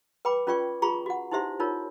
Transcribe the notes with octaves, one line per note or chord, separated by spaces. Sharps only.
B4 G5 B5 D6
C#4 F4 B4 D5 G5 C#6
F4 G#4 A#5 B5 C#6
F#4 F#5
D#4 E4 G4 C5 E5 C6
D#4 F4 A#4 C#5